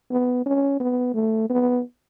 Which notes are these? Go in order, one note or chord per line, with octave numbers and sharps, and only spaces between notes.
B3
C#4
B3
A3
B3